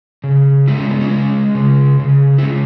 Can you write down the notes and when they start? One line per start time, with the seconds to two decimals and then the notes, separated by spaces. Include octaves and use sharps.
0.24 C#3
0.68 G#3 E4
0.78 C#4
0.90 B3
1.00 C#4
1.11 G#3
1.55 C#3
1.99 C#3
2.38 E4
2.42 G#3 C#4